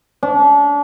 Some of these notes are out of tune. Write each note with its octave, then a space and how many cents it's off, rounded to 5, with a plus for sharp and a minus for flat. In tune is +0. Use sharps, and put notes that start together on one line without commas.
D4 -35